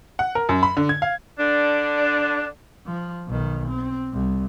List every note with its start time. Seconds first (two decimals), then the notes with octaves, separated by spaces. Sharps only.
0.19 F#5
0.35 A#4
0.49 F#2
0.63 B5
0.77 D3
0.89 G#6
1.02 F5
1.39 D3 D4
2.86 F3
3.28 B1 D#3
3.68 C4
4.13 C2